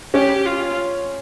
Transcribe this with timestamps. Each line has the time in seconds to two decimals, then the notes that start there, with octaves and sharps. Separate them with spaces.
0.14 C#4 G4
0.46 F4